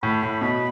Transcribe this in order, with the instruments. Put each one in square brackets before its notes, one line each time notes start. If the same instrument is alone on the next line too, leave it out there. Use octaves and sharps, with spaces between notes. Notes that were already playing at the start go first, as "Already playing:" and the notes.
[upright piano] A2 [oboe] B5
[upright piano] A2
B2